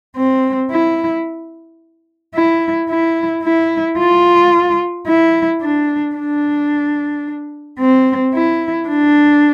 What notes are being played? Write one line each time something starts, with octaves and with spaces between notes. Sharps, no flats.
C4
E4
E4
E4
E4
F4
E4
D4
D4
C4
E4
D4